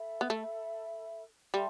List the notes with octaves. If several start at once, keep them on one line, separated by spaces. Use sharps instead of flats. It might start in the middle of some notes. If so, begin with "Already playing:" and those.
Already playing: A4 E5 B5
B3
A3
G3 A4 E5 A5 C6